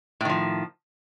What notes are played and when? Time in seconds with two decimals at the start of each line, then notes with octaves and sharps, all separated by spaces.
0.21 A2
0.25 D#3
0.29 F3